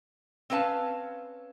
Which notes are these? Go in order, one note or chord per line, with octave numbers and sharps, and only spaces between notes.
C4 C#4 B4 F5 A5